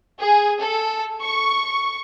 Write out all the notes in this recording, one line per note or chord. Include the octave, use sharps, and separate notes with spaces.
G#4
A4
C#6